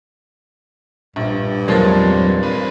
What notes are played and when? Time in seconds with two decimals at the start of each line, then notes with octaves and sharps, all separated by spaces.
1.16 A#1 G2
1.68 E2 A#2 F3 F#3 G#3 C4 A#4
2.43 C5 B5